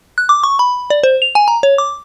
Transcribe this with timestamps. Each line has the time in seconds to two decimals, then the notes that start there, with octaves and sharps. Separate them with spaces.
0.18 F#6
0.29 D6
0.43 C#6
0.59 B5
0.90 D5
1.03 C5
1.22 F7
1.35 G#5
1.48 A#5
1.63 C#5
1.78 D6